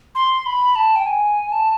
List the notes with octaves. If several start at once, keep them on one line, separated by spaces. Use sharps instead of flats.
C6
B5
A5
G5
G#5
A5